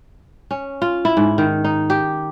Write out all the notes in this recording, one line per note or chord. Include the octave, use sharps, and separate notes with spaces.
C#4
F4
E4
G#2
D#3
D#4
G4